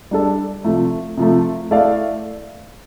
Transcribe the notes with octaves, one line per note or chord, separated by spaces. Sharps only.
G3 D4 A4
C3 F3 A3
C3 F3 A3
A3 E4 A4 D5 F5